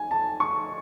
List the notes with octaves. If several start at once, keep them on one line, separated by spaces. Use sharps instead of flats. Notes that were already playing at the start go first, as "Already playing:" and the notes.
Already playing: G#5
A5
C#6